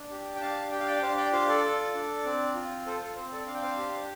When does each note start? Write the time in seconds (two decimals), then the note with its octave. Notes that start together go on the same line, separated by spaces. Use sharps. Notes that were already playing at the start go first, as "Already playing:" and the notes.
Already playing: D4
0.11 G4
0.35 G5
0.41 D4 F5 A5
0.71 G4 G5
0.80 F5
0.87 D5 G5
0.97 G5
1.02 D4 C5 F5
1.17 D5 G5
1.32 F4 C5 F5
1.48 A4 D5
1.64 A4
1.94 D4
2.25 C4
2.55 F4
2.86 A4 C5
3.01 A4
3.16 C4 C5
3.31 A4 D5
3.46 D4 F5
3.54 G5
3.62 C5 F5
3.77 G4